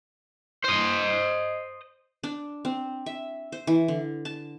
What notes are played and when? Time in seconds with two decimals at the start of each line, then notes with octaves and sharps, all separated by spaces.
0.65 C5 D#5
2.23 D4
2.65 C4
3.06 E5
3.52 C5
3.67 E3
3.88 D3
4.25 A5